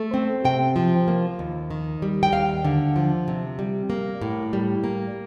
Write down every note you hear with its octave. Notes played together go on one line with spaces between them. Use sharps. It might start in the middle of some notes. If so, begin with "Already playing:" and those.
Already playing: A3
C4
C3 G5
F3
A#3
D#2
D#3
G3
G5
D#2 F5
D3
F3
C3
G3
A#3
A2
G3
A#3